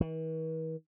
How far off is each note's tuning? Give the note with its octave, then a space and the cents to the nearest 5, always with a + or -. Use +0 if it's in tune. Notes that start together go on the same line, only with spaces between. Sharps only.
E3 -45